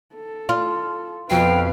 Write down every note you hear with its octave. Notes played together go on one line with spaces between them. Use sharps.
A4
F4
F2 B2 B4 F5 G5 C7